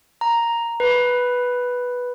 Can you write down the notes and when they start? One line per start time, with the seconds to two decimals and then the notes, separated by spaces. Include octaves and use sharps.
0.21 A#5
0.80 B4